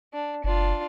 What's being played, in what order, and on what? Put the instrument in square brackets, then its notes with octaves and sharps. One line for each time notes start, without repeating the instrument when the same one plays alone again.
[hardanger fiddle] D4
[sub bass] F#1 [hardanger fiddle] D4 F4